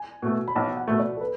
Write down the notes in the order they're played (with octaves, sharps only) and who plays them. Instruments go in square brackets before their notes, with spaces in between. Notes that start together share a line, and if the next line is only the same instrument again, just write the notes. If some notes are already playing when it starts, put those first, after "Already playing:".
Already playing: [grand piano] G#5
[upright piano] B2 A3
[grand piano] B5
[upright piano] B1 [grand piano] A5
[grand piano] F#5
[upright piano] B2 A3
[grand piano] D5
A4
B4